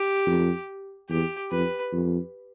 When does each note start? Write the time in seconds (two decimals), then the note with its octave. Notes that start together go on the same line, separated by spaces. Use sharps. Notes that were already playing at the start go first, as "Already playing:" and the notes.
Already playing: G4
0.26 F2
1.09 E2 G4
1.51 F2 B4
1.92 F2